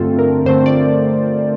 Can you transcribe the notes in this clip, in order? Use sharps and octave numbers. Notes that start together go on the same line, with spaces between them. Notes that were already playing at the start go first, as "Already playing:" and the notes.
Already playing: G2 D3 A3 C4 F4 A4
A#4
G2 D3 A3 C4 C5
D5